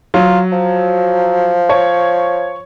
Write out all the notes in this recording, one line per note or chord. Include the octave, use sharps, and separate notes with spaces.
F#3 F4
F3
C#5